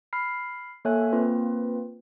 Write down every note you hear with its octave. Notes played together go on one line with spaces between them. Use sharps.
B5 F6 C7
A#3 A4 C#5 E5 G#5 F#6
A#3 C4 F4 B4